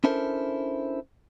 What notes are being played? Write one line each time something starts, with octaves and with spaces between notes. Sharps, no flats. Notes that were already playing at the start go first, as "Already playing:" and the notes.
C#4 D4 E4 A4 A#4 C5